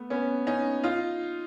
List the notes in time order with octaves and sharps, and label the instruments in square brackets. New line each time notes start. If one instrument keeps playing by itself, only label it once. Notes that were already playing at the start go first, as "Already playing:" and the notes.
Already playing: [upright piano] A3 B3
B3 C#4
C#4 D#4
D#4 F4